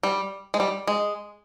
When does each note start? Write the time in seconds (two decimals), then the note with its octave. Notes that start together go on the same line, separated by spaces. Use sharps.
0.03 G3
0.54 G#3
0.60 G3
0.87 G#3